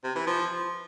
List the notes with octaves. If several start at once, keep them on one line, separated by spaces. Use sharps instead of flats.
C3
E3
F3